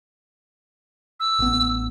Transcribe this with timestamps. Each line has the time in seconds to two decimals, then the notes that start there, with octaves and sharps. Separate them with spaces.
1.20 E6
1.39 A1 B3